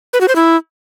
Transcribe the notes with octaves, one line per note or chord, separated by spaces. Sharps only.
B4
F#4
C5
E4